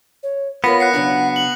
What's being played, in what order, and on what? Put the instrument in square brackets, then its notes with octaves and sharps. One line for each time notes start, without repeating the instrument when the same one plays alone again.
[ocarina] C#5
[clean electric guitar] B3 [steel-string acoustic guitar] F4 A#4 C#5 [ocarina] B5 [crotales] A#6 B6
[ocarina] F#5 [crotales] F#6 C7 C#7
[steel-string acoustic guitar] C#3 F#3 D4
[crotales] F#7